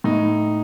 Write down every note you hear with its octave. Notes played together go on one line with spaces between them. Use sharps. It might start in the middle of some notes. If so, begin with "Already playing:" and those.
A2 D#4